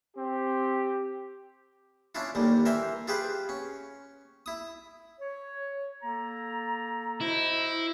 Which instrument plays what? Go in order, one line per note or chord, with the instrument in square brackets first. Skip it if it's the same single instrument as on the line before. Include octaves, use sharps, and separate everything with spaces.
[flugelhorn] C4 [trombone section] G4
[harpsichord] C#4 D4 E4 F4
D#2 A#2 D3 G3
E3 A#4 C5 E5 G#5 C6
F4 G4 G#4 B4 C5
C#4
E4 D#6
[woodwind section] C#5
A#3 A4 A#5
[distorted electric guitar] E4 [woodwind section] F#4 C5 D#5